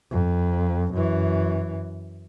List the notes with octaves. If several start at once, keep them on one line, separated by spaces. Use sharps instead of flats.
F2
F#2 E3